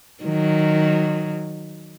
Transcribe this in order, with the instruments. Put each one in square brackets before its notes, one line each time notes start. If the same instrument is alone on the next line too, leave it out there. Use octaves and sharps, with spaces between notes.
[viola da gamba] D#3 F#3